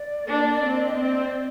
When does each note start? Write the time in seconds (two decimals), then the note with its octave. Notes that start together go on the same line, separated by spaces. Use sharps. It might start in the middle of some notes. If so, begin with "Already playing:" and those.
Already playing: D5
0.27 A#3 D4
0.62 C4
0.85 D#5
0.96 C4 D5